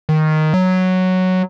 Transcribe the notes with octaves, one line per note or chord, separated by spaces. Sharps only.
D#3
F#3